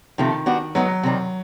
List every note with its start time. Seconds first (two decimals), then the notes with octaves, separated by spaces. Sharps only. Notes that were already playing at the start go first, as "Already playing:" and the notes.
0.18 C3 D#3 F3 A3 C4
0.46 G3 B3 D4 F#4
0.75 F#3 G#3 B3 D#4
1.03 C3 D#3 G3